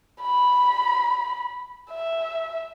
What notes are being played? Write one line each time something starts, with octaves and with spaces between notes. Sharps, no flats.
B5
E5